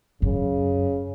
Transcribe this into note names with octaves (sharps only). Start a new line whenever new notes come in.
F#2 C#3